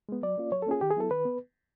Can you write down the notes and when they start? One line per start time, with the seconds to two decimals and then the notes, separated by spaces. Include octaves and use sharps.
0.09 G#3 B3
0.23 F#3 D5
0.38 A#3 C#4 F4
0.52 F#3 C#5
0.62 A4
0.67 A#3 C#4 F4 G#4
0.81 D#3 G4
0.91 G#4
0.97 F#3 B3 E4 A4
1.11 D#3 B4
1.25 B3